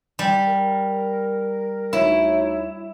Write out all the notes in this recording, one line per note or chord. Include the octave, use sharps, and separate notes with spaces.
G3
A#4
D2 D#4 E4 C#5